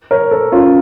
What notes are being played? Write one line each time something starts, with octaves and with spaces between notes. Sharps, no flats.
A#4 C#5
A4 C5
C#4 F4